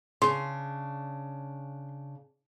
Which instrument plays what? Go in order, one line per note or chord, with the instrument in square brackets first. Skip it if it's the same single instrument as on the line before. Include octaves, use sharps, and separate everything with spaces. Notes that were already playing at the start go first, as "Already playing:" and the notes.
[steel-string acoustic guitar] C#3 D4 [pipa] C6